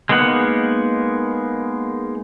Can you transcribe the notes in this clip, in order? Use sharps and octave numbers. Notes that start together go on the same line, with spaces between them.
G#3 A#3 B3 D#4 F#5